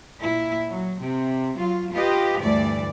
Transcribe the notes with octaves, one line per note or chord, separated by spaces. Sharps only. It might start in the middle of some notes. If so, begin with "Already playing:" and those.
A#2 E4
F#3
C3
F#3 F4
F4 G4 B4 D#5
D2 G2 E3 D5